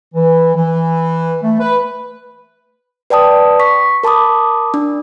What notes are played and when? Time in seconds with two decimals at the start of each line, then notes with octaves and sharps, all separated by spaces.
0.14 E3
0.55 E3
1.43 A3
1.60 B4
3.10 B4 D5 G5 A5 D#6
3.59 C#6 B6
4.03 A#4 A5 B5 D6 D#6
4.74 D4